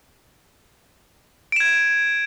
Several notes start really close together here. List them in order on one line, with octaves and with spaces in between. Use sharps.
D7 E7 G#6